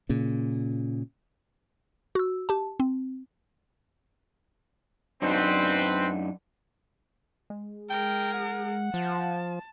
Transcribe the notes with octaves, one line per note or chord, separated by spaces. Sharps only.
A#2 C#3
F#4 E6
G4 A5
C4
F#2 C4 D4 D#4 B4
G#3
G#4 A#4 G5
F#5
F3 A5